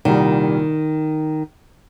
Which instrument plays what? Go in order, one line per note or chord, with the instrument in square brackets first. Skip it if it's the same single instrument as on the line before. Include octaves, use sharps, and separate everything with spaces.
[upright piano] C2 A#2 G3 [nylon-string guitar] D#3